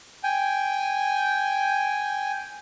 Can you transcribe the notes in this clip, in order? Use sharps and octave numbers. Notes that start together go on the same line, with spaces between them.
G5 G#5